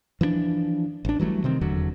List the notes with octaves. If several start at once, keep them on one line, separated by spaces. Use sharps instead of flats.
E3 F3 B3 D4
A1 D4
E3 F#3 G3 A3
C3 D#3 C4
F1 E2 D3 F#3